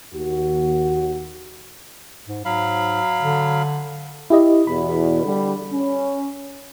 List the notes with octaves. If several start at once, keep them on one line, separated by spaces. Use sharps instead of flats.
D#2 F#4
G#2
G#2 F#3 F5 B5
D3
E4 G4 D#5
E2 B2 B5
D3 G3
C#4